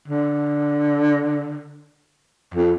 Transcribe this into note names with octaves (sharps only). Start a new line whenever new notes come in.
D3
F2